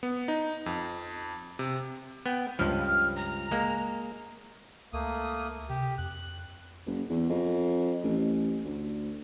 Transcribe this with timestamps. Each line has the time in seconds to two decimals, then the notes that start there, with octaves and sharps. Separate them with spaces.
0.03 B3
0.28 D#4
0.66 F2
1.59 C3
2.26 B3 G5
2.59 C#2 G2 F3 F6
3.16 A#5
3.51 G#3 A#3
4.93 C#2 A3 A#3 D#6
5.69 C3 G4
5.98 F2 F#6
6.87 F#1
7.10 E2
7.30 F2
8.04 A1
8.64 D2